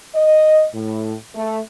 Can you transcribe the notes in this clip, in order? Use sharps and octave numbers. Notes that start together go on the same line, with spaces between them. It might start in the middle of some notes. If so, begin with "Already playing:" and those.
D#5
A2
A3